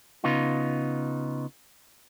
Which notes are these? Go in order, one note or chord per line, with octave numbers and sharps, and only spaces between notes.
C#3 B3 D#4 F4